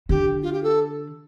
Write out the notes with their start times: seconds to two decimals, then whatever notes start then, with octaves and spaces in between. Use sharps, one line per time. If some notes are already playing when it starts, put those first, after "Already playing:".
0.09 D3 G4
0.43 F4
0.53 G4
0.63 A4